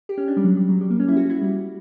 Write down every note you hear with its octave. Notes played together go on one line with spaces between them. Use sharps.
G4
C#4
D4
G3
F#3
G3
F#3
G3
A#3
C#4
E4
F#4
E4
G3